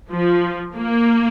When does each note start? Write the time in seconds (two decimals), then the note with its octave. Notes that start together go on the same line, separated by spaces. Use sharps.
0.11 F3
0.75 A#3